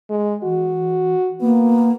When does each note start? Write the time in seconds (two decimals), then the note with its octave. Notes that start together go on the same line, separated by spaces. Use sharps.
0.10 G#3
0.43 E3 F#4
1.41 A#3 B3